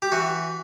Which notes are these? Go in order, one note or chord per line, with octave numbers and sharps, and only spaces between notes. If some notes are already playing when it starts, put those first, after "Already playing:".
G4
E3 F#4